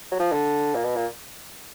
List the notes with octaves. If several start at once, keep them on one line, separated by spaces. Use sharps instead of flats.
F#3
F3
D3
A#2
B2
A#2